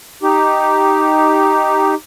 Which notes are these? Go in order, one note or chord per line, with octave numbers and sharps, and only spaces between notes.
D#4 G4